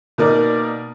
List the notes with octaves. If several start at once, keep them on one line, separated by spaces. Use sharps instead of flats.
B2 A#3 D#4 A#4 D5